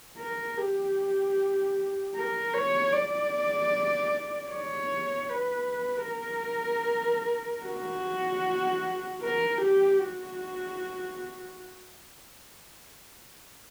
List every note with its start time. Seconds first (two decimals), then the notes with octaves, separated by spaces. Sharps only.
0.18 A#4
0.57 G4
2.15 A#4
2.54 C#5
2.93 D5
4.50 C#5
5.29 B4
6.08 A#4
7.66 F#4
9.23 A#4
9.61 G4
10.01 F#4